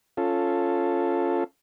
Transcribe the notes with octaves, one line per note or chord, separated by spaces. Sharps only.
C#4 F4 A4